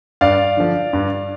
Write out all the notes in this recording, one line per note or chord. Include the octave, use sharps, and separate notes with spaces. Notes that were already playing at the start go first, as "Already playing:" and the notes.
G2 D5 F5
D3 F3
G2